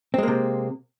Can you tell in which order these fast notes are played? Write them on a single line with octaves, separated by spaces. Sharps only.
C4 G#3 A#3 C3